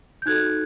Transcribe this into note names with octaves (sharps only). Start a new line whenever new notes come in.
G6
D#4 F#4 A4 F#6 G#6